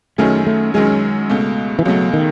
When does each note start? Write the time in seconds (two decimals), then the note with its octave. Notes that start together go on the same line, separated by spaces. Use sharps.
0.18 F#2 D#3 F#3 A3 C#4 G#4
0.47 A3
0.74 F#2 D#3 F#3 G#3 C#4 G#4
1.30 C#2 B2 A3
1.79 E3
1.85 C#2 B2 F#3 A3
2.13 D#3